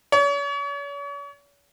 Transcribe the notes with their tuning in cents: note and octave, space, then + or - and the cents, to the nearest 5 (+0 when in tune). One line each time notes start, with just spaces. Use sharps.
C#5 +40